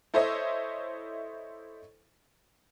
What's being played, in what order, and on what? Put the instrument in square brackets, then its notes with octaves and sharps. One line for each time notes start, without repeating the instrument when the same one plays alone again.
[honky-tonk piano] E4 A4 C5 C#5 D#5 E5